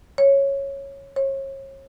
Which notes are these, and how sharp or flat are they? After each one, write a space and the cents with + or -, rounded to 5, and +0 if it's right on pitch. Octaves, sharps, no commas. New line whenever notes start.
C#5 -10
C#5 -35